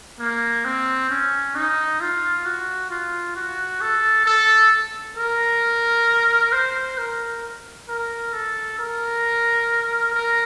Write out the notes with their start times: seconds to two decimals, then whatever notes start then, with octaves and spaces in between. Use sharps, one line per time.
0.20 A#3
0.65 C4
1.10 C#4
1.55 D#4
2.01 F4
2.45 F#4
2.90 F4
3.36 F#4
3.81 A4
4.26 A4
5.17 A#4
6.53 C5
6.98 A#4
7.89 A#4
8.33 A4
8.79 A#4
10.14 A#4